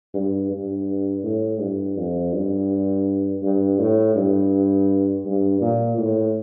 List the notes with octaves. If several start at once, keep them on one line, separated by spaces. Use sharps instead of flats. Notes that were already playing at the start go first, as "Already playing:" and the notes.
G2
G2
A2
G2
F2
G2
G2
A2
G2
G2
A#2
A2